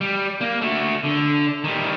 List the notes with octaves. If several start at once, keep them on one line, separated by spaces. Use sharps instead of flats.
G3
A#3
A3 F#4
D3
D#3 G3